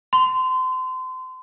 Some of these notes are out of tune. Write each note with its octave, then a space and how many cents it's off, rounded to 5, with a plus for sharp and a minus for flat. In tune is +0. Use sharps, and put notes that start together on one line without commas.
C6 -30